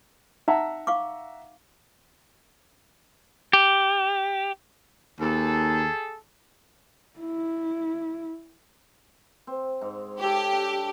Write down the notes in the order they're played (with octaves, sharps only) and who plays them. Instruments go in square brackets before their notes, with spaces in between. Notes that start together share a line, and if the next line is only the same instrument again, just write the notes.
[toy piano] D#4 [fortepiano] E5 F#5 A#5
[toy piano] F5 C#6 D6
[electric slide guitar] G4
[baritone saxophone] D#2 [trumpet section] G#4 A4
[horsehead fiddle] E4
[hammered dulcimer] C4
G#2
[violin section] G4 [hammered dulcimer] A4 C#5
[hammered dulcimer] D4